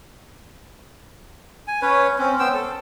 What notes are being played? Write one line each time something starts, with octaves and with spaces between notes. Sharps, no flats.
G#5
C#4 B4 C#5
C4 C#4
B3 C5 G5 E6
A4